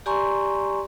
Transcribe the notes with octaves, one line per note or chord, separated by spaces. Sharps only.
G4 D5 G#5 A#5 C6 C#6